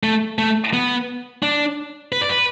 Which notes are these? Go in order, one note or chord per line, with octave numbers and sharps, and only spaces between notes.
A3
A3
B3
D4
B4
D5
B4